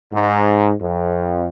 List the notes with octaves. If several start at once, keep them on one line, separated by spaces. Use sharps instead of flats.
G#2
F2